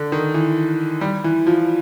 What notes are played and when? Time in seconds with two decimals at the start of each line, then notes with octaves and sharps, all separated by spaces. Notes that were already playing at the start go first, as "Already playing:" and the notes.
Already playing: D3
0.12 D#3
0.34 E3
1.01 G3
1.24 E3
1.47 F3